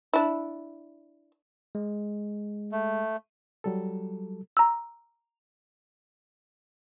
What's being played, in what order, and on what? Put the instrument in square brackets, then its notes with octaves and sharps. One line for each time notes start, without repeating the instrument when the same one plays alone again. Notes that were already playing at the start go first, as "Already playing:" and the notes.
[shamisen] D4 E4
[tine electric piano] G#3
[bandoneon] A3
[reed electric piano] F#3 G3 A4
[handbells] A#5 E6